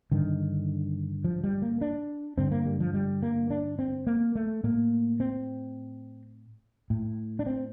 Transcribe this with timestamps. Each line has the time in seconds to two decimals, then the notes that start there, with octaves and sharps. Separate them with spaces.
0.12 G2 D3 D#3
1.24 F3
1.44 G3
1.62 A#3
1.81 D4
2.38 G2 D3 C4
2.51 A#3
2.66 G3
2.80 F3
2.94 G3
3.23 A#3
3.50 D4
3.79 C4
4.07 A#3
4.36 A3
4.64 A2 A#3
5.20 C4
6.90 A2
7.39 D4
7.46 C4